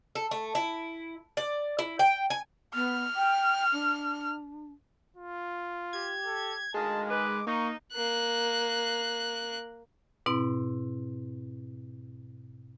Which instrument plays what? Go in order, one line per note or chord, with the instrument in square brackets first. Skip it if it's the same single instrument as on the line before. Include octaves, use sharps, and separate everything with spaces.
[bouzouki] A4
A3
E4
D5
E4
G5
G#5
[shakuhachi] B3 [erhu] F6
[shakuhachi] G5
D4
[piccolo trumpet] F4
[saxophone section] G4 [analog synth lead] G#6
[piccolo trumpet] A4
[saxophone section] D2 D#3 F5 [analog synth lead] G#3 [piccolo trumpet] A5
[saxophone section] D#3 B4 [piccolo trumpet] D6
[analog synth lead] A#3 [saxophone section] D#4 [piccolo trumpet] C#6
[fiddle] A#3 F#6
[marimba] G#2 B2 C4 E4